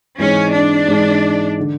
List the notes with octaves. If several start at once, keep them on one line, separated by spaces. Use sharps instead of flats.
G#2 E3 G#3 C4 C#4 D#4
D4
G#2 E3 G#3 C4 D#4
D3